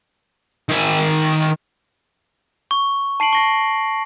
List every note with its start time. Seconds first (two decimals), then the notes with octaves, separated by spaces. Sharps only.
0.69 D#3 G#5
2.71 C#6
3.20 A5 C7 D7 F#7
3.33 C#6 A#6 C7